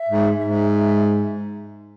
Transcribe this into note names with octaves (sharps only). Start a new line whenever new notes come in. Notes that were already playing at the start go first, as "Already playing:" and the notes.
Already playing: E5
G#2
G#2 E5